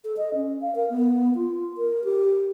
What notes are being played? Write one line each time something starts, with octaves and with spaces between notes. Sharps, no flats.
A4
D#5
C#4
F5
A#4
B3
F4
A#4
G4